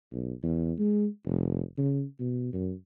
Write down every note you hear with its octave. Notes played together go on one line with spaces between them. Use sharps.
B1
E2
G#3
F1
C#3
B2
F#2